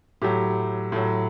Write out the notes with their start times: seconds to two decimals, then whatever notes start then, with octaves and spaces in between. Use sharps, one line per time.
0.22 A2 F#3 G4
0.92 A2 F#3